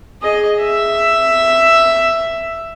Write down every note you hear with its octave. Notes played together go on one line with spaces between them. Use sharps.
G#4 D#5
E5